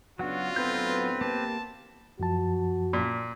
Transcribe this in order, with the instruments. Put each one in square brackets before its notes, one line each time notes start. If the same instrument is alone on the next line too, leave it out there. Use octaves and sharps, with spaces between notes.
[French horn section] C#3 B3 D4 [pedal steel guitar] F#3 F#5 [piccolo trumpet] F4 [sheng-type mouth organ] F#4
[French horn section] A2 D3 B3 [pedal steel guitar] F#3 A4 G6 [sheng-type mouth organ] C4 B4
[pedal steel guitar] A#3 G4 [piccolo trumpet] A5
[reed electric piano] F#2 F3 A5 [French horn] F#4
[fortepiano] A#2